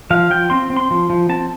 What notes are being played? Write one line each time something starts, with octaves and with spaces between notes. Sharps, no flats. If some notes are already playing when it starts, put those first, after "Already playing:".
F3 F5
F3 G5
C4 C6
C4
C6
F3
F3
C4 A5